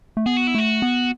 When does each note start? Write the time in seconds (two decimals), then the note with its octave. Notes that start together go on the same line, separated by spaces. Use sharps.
0.17 A3
0.26 B3 G#4
0.37 F#4
0.47 E4
0.55 A3 F#4
0.82 B3